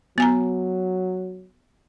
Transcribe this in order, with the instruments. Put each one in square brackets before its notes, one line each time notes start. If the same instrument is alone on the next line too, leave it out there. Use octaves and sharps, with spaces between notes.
[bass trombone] F#3 [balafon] B3 G#5 A#5